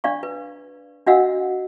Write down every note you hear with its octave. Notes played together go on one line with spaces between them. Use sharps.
D4 D5 F5 C#6
B4
D4 F#4 D#5 F5 F#5 E6